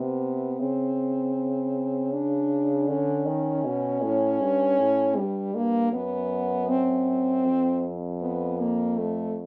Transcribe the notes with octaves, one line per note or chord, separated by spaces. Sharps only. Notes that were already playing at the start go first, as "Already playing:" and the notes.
Already playing: C3 B3
C#3 C4
D4
D3 C#4
D#3
B2
A2
G2
A2
G2 G3
G2 A#3
F#2 B3
C4
F2
B3
A#3
A3